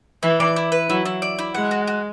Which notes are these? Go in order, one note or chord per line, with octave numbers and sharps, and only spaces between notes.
E3 E4
D5
E4
B4
F#3 E4
E4
D5
E4
G#3 F#5
F#4
F#4